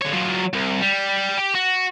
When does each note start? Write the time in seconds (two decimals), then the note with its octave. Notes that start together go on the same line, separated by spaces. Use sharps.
0.01 D3 C#5
0.13 F#3 F4
0.53 C2
0.81 G3
1.38 G4
1.55 F#4